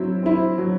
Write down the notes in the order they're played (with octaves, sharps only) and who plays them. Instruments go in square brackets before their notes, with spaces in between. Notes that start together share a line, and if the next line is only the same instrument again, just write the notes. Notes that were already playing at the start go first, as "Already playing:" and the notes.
Already playing: [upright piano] F#3 C4 E4
C4 E4
F#3